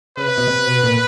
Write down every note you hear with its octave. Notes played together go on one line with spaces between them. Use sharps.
C#3 B4
C3
B2
C3
B2
A#2